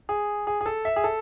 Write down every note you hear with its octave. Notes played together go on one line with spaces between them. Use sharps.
G#4
G#4
G#4
A4
E5
G#4
A4